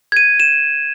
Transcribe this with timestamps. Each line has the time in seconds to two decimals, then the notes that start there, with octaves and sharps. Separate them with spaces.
0.12 G#6 D#7
0.40 E7